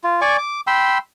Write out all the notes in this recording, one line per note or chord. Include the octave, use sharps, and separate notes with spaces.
F4
D5 G#5 C#6 D6
D6
G5 B5 C6 E6